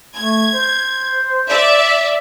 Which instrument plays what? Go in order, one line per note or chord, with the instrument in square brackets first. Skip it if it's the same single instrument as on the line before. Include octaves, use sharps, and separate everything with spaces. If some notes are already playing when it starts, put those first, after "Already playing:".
[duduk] A3 [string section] G#6
[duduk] C5
[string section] D5 E5